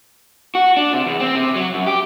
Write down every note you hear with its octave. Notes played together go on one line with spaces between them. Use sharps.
F#4
D4
C3
E2
C4
C3
F#3
F#2
G4